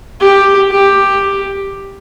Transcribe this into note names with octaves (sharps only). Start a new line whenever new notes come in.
G4
G4